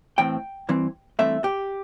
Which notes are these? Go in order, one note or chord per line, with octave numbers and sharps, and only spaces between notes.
A2 E3 C4 G5
G2 E3 C4
G2 E3 A3 C4 E5
G4